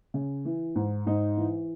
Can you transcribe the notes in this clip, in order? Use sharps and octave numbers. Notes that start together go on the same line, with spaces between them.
C#3
E3
G#2
G#2 D#4
E3